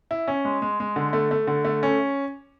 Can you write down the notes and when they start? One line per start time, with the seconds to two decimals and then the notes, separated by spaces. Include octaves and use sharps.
0.11 E4
0.28 C#4
0.45 G#3
0.62 G#3
0.80 G#3
0.96 D3
1.13 A3
1.31 A3
1.47 D3
1.65 A3
1.83 C#4